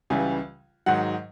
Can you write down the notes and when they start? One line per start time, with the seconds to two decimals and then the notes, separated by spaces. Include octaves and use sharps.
0.10 C#2 C#3 E3 G3 G#5
0.86 G#2 D#3 F#3 F#5